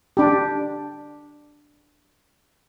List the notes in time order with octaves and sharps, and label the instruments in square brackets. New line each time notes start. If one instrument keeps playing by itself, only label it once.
[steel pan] D4 G4